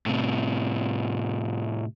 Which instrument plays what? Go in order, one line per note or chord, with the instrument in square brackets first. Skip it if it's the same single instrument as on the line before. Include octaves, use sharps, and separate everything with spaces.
[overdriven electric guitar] A2 C3